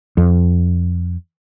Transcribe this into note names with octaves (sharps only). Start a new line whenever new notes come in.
F2